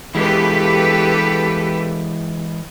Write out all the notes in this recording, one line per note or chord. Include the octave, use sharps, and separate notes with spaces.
E3 G#3 G4 A4 B4